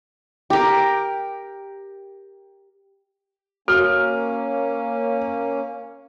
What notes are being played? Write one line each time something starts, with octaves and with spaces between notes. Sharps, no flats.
G4 A#4
A#3 C#4 F#4 F6